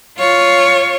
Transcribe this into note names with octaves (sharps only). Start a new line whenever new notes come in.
F4 C#5